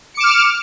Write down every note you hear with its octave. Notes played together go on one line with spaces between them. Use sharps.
D6 F6 C#7 E7